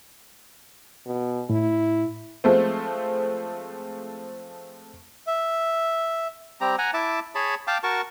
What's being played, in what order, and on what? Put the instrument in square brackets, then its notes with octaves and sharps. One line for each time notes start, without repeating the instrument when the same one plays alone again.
[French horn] B2
[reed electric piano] A2 [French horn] E4
[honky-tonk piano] F3 G#3 A3 C4
[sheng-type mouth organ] E5
[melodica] G3 C4 G4 A#5
F#5 G#5 A#5
E4 E5 A5 D6
G#4 C#5 A5 B5
F5 G5 A5 D6
F#4 A#4 A5 C#6